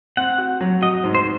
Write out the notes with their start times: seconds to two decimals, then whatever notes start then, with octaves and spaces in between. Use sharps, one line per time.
0.17 C4 F#5
0.38 F#4
0.61 F#3
0.82 F#4 D#5
1.04 G#2
1.15 C5